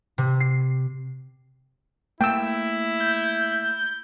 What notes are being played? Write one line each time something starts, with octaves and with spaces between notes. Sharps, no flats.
C3
C7
A3 A#3 E4 G5 E6
G6